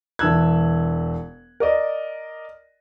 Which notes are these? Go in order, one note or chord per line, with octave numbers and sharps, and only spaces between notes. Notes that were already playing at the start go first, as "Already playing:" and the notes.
E1 E3 A5 E6 F#6 G#6
A#4 D5 D#5